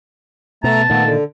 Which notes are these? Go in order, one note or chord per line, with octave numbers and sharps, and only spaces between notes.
B2 A3 A5 A#5
A#2 D#3 A3 B3
D3